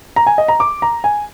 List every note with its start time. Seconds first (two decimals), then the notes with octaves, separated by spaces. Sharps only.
0.16 A#5
0.27 G#5
0.38 D#5
0.48 A#5
0.60 D6
0.82 A#5
1.04 G#5